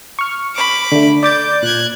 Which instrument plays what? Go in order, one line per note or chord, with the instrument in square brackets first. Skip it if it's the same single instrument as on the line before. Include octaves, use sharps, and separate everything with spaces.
[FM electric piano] C#6 F6
[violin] B5 D6
[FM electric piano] D3 A3
[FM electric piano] D5 D6 A6 [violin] G6
[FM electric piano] A#2 [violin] F#6 G#6